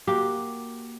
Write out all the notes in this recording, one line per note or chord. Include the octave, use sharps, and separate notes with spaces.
A#3 F#4 G4